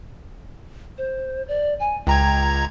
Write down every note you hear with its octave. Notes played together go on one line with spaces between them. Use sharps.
C5
D5
G#5
C#2 G5 A#5 G#6